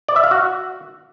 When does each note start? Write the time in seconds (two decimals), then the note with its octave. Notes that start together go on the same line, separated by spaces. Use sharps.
0.09 D5
0.16 E5
0.24 F5
0.31 F#4